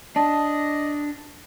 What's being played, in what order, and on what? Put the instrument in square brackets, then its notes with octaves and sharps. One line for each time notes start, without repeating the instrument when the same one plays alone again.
[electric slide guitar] D4 [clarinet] D#5 [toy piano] A5